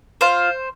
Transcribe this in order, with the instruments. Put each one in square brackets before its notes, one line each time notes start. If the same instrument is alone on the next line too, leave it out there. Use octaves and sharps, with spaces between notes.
[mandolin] F4 C5